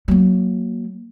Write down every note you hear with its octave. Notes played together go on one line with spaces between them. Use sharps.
F#3 A#3